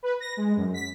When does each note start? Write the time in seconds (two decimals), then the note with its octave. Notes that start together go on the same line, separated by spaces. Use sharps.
0.03 B4
0.20 A#6
0.37 G#3
0.56 F#2
0.74 B6